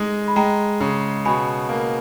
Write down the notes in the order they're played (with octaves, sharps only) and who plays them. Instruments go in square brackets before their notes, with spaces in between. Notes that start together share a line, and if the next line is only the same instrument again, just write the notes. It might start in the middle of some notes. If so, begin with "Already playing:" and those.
Already playing: [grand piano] G#3 D#4
[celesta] B5
[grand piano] G#3 [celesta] G5 A#5
[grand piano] C#3
[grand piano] B2 [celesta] G#5 B5
[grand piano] A#3